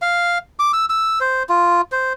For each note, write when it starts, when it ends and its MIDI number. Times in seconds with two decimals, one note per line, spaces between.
0.02 0.38 77
0.59 0.72 86
0.73 0.85 88
0.90 1.19 88
1.21 1.43 72
1.49 1.81 65
1.92 2.13 72